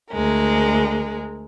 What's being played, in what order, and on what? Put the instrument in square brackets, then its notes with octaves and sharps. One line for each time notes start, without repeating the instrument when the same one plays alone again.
[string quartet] D2 G#3 A#4